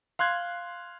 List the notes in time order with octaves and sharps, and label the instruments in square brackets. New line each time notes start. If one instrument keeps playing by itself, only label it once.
[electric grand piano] F5 C6 F#6 G#6